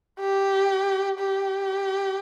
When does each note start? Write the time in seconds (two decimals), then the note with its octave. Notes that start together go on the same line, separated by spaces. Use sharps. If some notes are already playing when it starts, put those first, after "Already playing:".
0.20 G4
1.19 G4